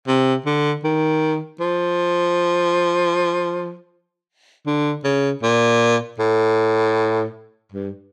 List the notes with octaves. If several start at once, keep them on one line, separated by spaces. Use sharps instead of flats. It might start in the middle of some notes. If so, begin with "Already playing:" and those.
C3
D3
D#3
F3
D3
C#3
A#2
A2
G2